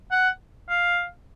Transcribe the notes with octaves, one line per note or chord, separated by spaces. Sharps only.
F#5
F5